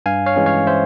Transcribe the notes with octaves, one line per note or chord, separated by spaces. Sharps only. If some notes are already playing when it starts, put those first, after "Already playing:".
G2 F5 G#5
C#5 F5
E3 G#3 C#4
C#5 F5
C5 E5